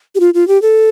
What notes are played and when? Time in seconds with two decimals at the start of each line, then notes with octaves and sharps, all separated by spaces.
0.15 G4
0.20 F4
0.34 F4
0.48 G4
0.62 A4